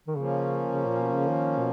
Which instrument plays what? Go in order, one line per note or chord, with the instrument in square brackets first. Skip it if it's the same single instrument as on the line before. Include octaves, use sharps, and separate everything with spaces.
[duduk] D#3
[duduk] C#3 [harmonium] F3 A#3 C#4
[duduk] C#3
A#2
B2
C#3
D#3
B2